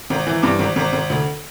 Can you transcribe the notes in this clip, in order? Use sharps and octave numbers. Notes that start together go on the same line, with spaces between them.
G#1
E3
G2 D6
G#1
G#1
G#1
D2